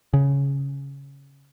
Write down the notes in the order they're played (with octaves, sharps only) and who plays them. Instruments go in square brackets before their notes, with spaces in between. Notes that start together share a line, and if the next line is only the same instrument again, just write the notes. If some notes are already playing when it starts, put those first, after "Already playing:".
[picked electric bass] C#3